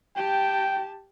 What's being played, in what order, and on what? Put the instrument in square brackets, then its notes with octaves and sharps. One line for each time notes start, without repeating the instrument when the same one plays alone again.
[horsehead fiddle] G4 A5 [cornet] G5